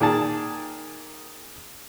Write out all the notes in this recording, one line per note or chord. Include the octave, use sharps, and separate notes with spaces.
A#2 D#3 G#4 A5